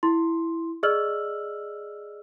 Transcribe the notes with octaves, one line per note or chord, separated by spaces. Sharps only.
E4 C6
G#4 D5 D#5 E6 F6 F#7